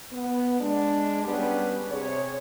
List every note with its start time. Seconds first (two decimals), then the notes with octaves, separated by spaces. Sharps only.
0.12 B3
0.61 G#3 D4
1.25 G3 B3 C#4 D4 G4 G#4
1.90 C3 G#4 C#5